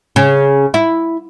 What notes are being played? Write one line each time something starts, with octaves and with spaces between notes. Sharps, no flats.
C#3
E4